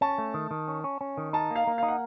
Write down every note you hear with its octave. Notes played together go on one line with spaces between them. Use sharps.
C#4 A5
A3
D#3
D#3
C#4
C#4
C#4
D#3
D#4 A5
A#3 F5
A#3
D#4 F5
F#5